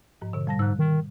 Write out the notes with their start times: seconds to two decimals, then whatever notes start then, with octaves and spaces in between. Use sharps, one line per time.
0.21 G#2 F3
0.33 B2 D3
0.47 G3 A5 A#6
0.59 G#2 E6 F#6
0.79 D#3